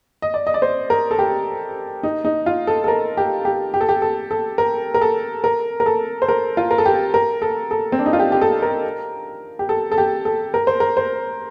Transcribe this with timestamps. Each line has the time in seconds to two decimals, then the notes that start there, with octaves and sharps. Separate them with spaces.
0.22 D#5
0.34 D5
0.47 D#5
0.54 D5
0.62 C5
0.90 A#4
1.11 A4
1.19 G4
2.03 D#4
2.25 D#4
2.46 F4
2.67 A4
2.84 A4
2.88 A#4
3.17 G4
3.45 G4
3.74 G4
3.81 A4
3.89 G4
4.02 A4
4.31 A4
4.58 A#4
4.94 A#4
5.01 A4
5.44 A#4
5.80 A#4
5.86 A4
6.22 C5
6.29 A#4
6.57 F4
6.71 A#4
6.78 A4
6.85 G4
7.14 A#4
7.42 A4
7.71 A4
7.92 C4
7.99 D4
8.06 D#4
8.13 F4
8.19 G4
8.32 G4
8.41 A4
8.62 A#4
9.59 G4
9.69 A4
9.92 A4
9.98 G4
10.25 A4
10.54 A#4
10.67 C5
10.80 A#4
10.97 C5